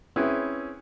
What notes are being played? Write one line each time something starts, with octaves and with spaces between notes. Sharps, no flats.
C4 C#4 E4 G#4 B4